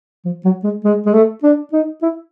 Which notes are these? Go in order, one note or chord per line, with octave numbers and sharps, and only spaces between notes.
F3
F#3
G#3
G#3
G#3
A3
D4
D#4
E4